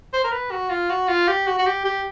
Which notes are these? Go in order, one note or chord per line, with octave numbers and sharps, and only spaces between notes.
C5
A#4
B4
F#4
F4
F#4
F4
G4
F#4
F#4
G4
G4